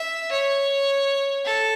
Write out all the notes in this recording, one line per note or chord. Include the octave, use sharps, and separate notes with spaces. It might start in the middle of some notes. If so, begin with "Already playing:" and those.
Already playing: E5
C#5
A4